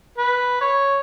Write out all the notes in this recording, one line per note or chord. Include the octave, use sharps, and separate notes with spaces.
B4
C#5